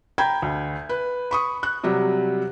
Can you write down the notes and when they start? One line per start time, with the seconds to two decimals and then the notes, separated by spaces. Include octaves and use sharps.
0.18 G5 A#5 B5 G6 G#6
0.42 D2
0.89 B4
1.31 B5 C#6 D#6
1.63 F#6
1.84 C3 F#3 G3